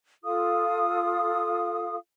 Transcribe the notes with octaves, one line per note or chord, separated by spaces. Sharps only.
F4 A4 F5 D#6